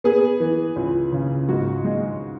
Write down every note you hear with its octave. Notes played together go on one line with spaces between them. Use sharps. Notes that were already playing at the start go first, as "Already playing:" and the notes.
B3 G#4
E3
C#2
C#3
G#2 F#4
G#3